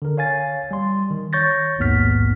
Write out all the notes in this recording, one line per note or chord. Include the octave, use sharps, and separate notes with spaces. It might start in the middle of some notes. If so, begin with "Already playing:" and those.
D3 A#4
C#5 F5 G#5 A6
G3 C6
D#3
C#5 C#6 G6 A6 A#6
A#1 D#2 G#2 B3 F6 B6